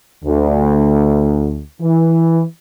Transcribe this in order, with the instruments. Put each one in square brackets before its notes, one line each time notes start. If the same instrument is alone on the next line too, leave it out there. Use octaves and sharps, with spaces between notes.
[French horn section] D2
E3